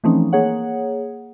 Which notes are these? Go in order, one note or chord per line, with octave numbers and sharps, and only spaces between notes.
E3 F3 A3 C4 C#4 D#4
A#3 G#4 C#5 F#5